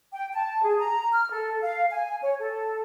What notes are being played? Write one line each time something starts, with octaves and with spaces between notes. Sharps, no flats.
G5
A5
G#4
A#5
F6
A4
F5
G#5
C#5
A4